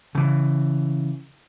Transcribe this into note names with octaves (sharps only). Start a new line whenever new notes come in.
C#3 E3